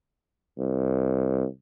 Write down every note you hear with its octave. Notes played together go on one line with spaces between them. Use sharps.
C2